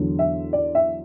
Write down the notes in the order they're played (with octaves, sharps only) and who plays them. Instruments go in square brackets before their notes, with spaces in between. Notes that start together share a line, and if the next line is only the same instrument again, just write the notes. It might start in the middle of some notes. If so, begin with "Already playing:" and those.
Already playing: [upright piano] E2 D3 F#3
E5
D5
E5